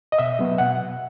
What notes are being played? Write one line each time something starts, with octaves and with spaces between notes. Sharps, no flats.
D#5
B2 E5
F#3 B3
B2 F#5